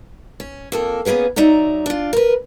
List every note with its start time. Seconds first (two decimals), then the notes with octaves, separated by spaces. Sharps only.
0.40 C#4
0.72 F2 A#3 A4
1.05 A#3 B3 C#4 G#4 B4
1.36 F#3 D#4 D5 E5 A#5
1.86 D4 F4
2.13 A#4 B4